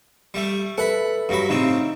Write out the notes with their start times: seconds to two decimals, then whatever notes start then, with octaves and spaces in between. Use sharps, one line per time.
0.34 G3 A3
0.78 A4 B4 E5 F#5 B5
1.29 G2 F#3 B5
1.49 A2 C#3 C4 D#4